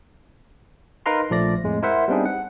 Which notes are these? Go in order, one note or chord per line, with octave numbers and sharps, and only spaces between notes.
D#4 A#4 B4 F5 A#5 C6
A#1 F3 A3 D5 A#6
F2 A2 G#3
E4 A#4 C5 E5 F#5
G3 B3 C4 D4 D#4 G#4
F#5